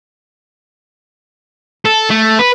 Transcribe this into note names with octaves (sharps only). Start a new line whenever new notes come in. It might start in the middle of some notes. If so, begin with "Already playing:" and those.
A4
A3
B4